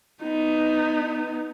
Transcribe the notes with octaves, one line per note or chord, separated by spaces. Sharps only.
B3 D#4